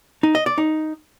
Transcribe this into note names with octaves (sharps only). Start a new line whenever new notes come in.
D#4
D#5
D5
D#4